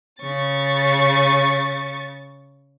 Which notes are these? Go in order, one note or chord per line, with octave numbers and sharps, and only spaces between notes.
C#3 C#6 A6